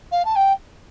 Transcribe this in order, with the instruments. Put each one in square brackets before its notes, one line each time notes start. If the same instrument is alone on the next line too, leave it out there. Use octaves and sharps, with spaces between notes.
[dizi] F5
A5
G5